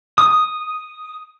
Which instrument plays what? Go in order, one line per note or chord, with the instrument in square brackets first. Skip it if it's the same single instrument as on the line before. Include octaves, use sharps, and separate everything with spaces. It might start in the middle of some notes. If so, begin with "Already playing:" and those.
[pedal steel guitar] D#6